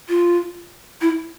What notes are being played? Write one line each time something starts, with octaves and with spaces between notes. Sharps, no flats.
F4
E4